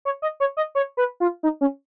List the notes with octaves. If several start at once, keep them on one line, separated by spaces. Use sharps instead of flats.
C#5
D#5
C#5
D#5
C#5
B4
F4
D#4
C#4